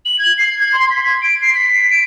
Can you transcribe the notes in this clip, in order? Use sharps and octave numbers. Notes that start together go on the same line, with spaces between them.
F#7
G#6
C7
G#6
C6
B6
G#6
D7
C7
B6
D7